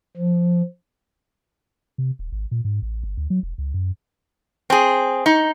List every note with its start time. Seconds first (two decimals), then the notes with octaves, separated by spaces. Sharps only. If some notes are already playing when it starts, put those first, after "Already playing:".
0.17 F3
1.98 C3
2.19 D#1
2.32 G#1
2.51 A#2
2.65 G#2
2.82 A1
3.04 G1
3.18 D2
3.30 F#3
3.43 E1
3.58 C#2
3.74 F#2
4.70 C4 G#4
5.26 D#4